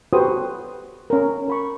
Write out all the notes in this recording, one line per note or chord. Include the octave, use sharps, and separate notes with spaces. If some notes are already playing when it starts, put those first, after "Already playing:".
F#4 G4 A4 B4 C5 D#6
C#4 A#4
A#4 B5 C#6